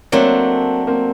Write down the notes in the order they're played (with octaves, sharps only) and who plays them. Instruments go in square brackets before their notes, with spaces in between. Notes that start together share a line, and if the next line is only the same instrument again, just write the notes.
[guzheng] F#3 A3 D4 [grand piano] A#3 C4
[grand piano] A#3 C4